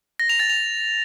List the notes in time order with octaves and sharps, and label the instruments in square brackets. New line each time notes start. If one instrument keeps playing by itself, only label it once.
[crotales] A#6
F7
A6
F7